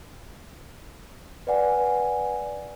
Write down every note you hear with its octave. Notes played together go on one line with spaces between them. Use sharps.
B4 D5 F#5 G#5